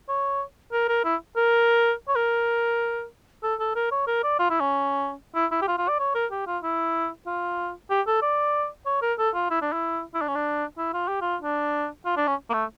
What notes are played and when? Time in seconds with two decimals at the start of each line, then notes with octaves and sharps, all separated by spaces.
0.08 C#5
0.72 A#4
0.88 A#4
1.04 E4
1.36 A#4
2.08 C#5
2.16 A#4
3.44 A4
3.60 A4
3.76 A#4
3.92 C#5
4.07 A#4
4.24 D5
4.39 F4
4.50 E4
4.61 C#4
5.35 E4
5.51 E4
5.62 G4
5.68 F4
5.78 F4
5.88 D5
6.00 C#5
6.15 A#4
6.32 G4
6.47 F4
6.63 E4
7.27 F4
7.90 G4
8.07 A4
8.22 D5
8.86 C#5
9.02 A#4
9.19 A4
9.34 F4
9.51 E4
9.62 D4
9.73 E4
10.14 E4
10.22 D4
10.28 C#4
10.35 D4
10.78 E4
10.94 F4
11.08 G4
11.21 F4
11.42 D4
12.06 F4
12.17 D4
12.27 C#4
12.50 A#3
12.54 A3